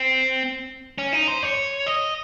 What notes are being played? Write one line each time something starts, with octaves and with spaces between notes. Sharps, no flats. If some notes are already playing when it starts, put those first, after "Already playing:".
Already playing: C4
C#4
D#4
C5
C#5
D#5